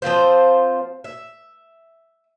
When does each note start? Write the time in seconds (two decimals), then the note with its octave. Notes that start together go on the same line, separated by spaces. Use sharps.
0.02 F3 C4 F4 C5
1.04 E5